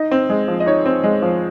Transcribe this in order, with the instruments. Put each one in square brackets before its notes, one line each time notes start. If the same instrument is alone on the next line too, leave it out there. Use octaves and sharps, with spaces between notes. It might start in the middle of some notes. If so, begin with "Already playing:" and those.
Already playing: [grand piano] D#4 D#5
C4
G#3
F3
D#5
D#4 C#5
C4
G#3
F3